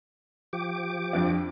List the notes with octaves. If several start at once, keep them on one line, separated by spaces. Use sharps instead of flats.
F3 G4 D6
F2 D4